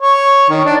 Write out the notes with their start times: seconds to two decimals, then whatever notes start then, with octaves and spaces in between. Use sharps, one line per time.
0.01 C#5
0.49 D#3
0.65 D4